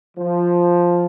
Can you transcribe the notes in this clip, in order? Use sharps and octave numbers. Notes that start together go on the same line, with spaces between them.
F3